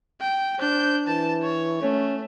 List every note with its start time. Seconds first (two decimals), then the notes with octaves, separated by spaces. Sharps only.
0.21 G5
0.59 D4 C5 G6
1.08 E3 A5
1.43 C#5
1.82 A3 C#4